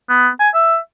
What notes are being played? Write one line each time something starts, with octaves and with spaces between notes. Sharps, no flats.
B3
G#5
E5